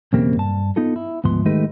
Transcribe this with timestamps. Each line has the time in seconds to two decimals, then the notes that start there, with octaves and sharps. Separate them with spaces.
0.13 B1 E2 C#3 A#3 C4 G4
0.36 G2 A5
0.76 B3 D#4 F4 A4
0.96 E4
1.24 D2 G#2 F3 B3 C6
1.45 D#3 G#3 A3 D#4 G4 B4